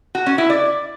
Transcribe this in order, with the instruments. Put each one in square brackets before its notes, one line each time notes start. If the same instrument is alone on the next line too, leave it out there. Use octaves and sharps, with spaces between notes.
[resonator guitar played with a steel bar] F#4
C#4
E4
D5